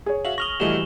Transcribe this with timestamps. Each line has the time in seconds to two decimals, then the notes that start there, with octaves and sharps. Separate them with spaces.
0.06 G#4 C#5
0.25 F#4 E5 F5 F#7
0.38 C#6 D#6 F6 A#6 F7 G7
0.60 A#1 E3 G3 A3 F#4 D#5 E7 G7